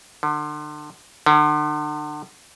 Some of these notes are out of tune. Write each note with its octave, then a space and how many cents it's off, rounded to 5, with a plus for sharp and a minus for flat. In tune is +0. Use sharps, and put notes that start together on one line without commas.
D3 +35
D3 +40